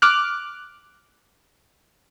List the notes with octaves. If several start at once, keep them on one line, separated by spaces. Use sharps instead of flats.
D6 F6 F#6